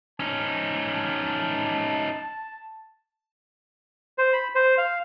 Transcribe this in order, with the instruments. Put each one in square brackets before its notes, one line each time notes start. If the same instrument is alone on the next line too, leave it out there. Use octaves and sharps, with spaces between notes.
[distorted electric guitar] C#4 D#4 [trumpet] A5
[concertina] C5
B5
C5
F5